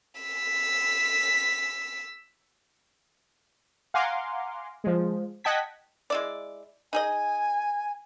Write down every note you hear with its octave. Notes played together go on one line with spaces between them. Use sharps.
E6 B6
F5 F#5 G#5 A#5 C6 D6
F3 G#3
D#5 F#5 G5 A5 G#6 B6
G#3 E4 D5
D#4 G#4 D#5 G#5